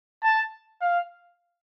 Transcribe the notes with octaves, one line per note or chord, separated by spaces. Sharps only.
A5
F5